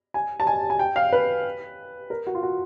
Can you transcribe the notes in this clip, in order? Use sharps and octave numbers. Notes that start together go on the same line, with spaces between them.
G#5
A5
G#5
G#5
G5
F5
B4
A#4
F#4
F4
F#4